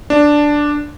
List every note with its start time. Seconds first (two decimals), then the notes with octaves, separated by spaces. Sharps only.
0.10 D4